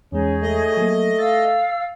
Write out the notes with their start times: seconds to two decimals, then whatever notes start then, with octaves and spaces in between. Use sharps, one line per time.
0.12 E2 G#3 C#4 D#4 G#4 C#5
0.43 A3 D#5
0.77 F#3 A#3
1.19 F5 E6 A6